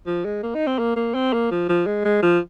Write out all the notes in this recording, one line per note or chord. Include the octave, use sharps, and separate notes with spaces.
F3
G#3
A#3
D#4
C4
A#3
A#3
C4
A#3
F3
F3
G#3
G#3
F3